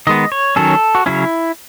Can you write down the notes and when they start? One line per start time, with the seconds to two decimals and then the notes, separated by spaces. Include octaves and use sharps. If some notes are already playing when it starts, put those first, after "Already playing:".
0.07 D#3 G#3 B3 D#5
0.32 C#5
0.56 D#3 F#3 C#4 A4
0.95 F#4
1.06 C#3 F#3 C#4 E4